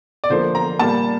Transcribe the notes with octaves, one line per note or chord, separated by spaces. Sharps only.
D5
D3 F3 A#3 C5
A#5
A#2 G3 A#3 A5